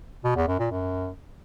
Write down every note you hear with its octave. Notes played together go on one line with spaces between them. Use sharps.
B2
E2
F#2
A#2
F#2